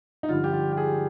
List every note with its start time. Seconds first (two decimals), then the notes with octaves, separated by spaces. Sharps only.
0.23 D#4
0.29 G2 D3 F3 F4
0.44 G4
0.52 F4
0.73 G4
0.77 G#4